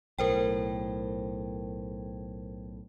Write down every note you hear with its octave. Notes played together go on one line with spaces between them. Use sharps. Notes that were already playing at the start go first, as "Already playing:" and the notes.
B1 A2 A#4 C5 G5